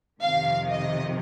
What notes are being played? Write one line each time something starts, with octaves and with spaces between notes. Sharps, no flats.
F2 C3 D#3 F5
D#5